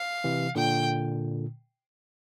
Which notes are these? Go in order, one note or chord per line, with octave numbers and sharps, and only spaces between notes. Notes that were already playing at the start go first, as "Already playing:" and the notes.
Already playing: F5
C3 E3
A#2 D3 G5